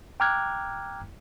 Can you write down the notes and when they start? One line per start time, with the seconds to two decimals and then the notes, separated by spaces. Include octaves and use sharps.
0.20 G5 A#5 D6 F6 F#6 G#6